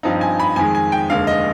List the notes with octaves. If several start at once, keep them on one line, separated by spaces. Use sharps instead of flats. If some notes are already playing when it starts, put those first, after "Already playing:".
G2 F3 C4 D#4
G#5
B5
F2 D#3 G#3 G#5
G#5
G5
F1 D#2 D3 G#3 F5
D#5